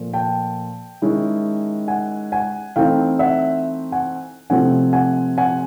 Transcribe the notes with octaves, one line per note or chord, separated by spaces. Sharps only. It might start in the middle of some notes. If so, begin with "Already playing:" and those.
Already playing: A#2 F3 A3
G5 A5
D#3 G#3 C#4 E4
F#5 G#5
F#5 G#5
E3 A3 C4 D#4 F5 G5
E5 F#5
F#5 G#5
C3 F3 A3 C4 E4 F#5 G#5
F#5 G#5
F#5 G#5